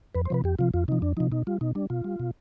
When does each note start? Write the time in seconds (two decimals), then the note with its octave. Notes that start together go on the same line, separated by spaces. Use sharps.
0.15 F2 B4
0.25 C5
0.30 C3 F3 B4
0.44 F2 G4
0.59 C3 F3 F4
0.74 F2 F4
0.88 C3 F3 D#4
1.02 F2 D4
1.17 C3 F3 D#4
1.32 B2 D#4
1.47 G3 F4
1.61 B2 D#4
1.75 G3 D4
1.90 B2 F4
2.04 G3
2.20 B2